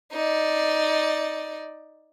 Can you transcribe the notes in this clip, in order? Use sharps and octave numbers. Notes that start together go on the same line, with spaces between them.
D#4 D5